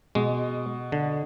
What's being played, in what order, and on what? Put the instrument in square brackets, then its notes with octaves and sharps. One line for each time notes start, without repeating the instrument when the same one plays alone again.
[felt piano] B2 [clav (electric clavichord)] G#3
[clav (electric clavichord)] D3